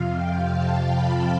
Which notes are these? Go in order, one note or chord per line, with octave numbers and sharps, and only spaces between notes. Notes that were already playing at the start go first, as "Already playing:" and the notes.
Already playing: F2 C3 F3 F5
G5
A5
B5